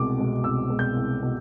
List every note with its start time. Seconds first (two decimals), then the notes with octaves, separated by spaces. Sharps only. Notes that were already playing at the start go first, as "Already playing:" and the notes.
Already playing: C2 B2 G#3 D6
0.18 B2 G#3
0.44 C2 E6
0.70 B2 G#3
0.79 G6
0.96 C2
1.22 B2